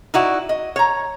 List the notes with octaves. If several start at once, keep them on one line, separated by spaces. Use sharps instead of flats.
D#4 E4 F#4 D5
D#5
C#5 A#5